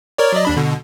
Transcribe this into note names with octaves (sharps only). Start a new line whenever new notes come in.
A#4 C#5 D5
F#3 D5 D#5
D#2 D4 B5
B2 D3